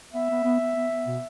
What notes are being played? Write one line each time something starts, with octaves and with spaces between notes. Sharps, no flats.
B3 E5
B3
B3
B3
B3
B3
B2